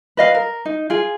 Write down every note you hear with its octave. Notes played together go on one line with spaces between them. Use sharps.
B4 D#5 F5
A#4
D#4
F4 G#4